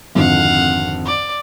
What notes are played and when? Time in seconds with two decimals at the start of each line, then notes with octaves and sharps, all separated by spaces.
0.15 G#1 F2 D3 F5 F#5
1.05 D5